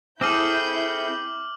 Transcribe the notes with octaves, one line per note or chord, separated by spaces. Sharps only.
C4 E4 G#4 A4 D6 F6 G6 F#7